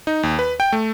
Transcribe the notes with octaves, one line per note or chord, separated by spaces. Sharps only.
D#4
D#2
B4
G5
A3